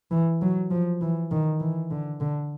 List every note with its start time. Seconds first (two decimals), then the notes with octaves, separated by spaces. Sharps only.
0.11 E3
0.42 F#3
0.71 F3
1.02 E3
1.31 D#3
1.60 E3
1.91 D3
2.20 D3